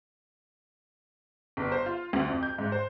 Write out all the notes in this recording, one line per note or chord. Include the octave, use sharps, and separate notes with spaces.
G1
C5
F4
D2
F2
G6
G#2
C5